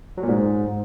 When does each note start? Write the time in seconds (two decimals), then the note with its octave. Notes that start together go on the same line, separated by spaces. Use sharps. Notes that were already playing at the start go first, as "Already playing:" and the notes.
0.17 F#3
0.23 A#2
0.29 G#2